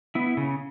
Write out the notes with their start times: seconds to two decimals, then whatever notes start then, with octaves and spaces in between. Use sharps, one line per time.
0.15 B3 E4
0.37 C#3